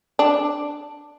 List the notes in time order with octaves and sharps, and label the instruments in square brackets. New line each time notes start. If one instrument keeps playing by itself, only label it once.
[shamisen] D4